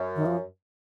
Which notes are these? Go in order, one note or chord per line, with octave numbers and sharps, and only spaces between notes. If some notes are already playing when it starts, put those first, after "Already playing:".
Already playing: F#2
D#3
F3